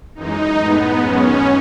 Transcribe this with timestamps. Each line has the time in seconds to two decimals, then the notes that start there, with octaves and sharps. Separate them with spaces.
0.15 F#2 E3 G#3 D#4
0.58 A2 G#3 B3
1.01 F#2 D#3 G#3 C#4